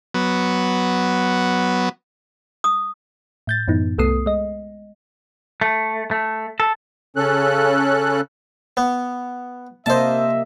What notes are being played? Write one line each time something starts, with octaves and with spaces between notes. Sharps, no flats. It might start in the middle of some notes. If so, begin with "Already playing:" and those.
F#3 B3
D#6
A2 G6 A6
F#2 A2 E3 B3 D#4
C2 A3 B3 A4 D#6 C7
G#3 D#5
A3
A3
A4
C#3 C#4 A4 F#6
B3
C3 A#3 C5 D#5 E5 A5